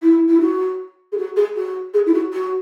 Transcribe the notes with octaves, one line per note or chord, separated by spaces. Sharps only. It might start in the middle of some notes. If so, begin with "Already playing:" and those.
E4
E4
F#4
G#4
F#4
G#4
F#4
G#4
E4
F#4
F#4